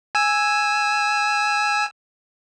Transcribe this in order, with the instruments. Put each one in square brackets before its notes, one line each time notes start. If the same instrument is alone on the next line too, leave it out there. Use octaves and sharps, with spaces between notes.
[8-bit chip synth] G#5 E6